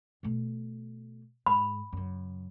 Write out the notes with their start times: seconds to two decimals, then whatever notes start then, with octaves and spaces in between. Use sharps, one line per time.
0.23 B2 A3
1.46 G#2 B5
1.93 F#2 C#3